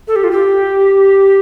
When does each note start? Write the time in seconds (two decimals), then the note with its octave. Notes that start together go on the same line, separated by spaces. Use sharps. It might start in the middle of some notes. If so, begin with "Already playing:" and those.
0.08 A4
0.16 G4
0.24 F4
0.31 G4